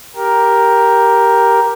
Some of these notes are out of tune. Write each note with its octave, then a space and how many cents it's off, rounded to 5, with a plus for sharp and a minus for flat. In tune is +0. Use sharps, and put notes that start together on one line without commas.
G4 +0 A#4 +5